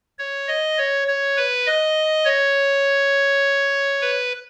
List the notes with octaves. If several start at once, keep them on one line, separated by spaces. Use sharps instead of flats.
C#5
D#5
C#5
C#5
B4
D#5
C#5
B4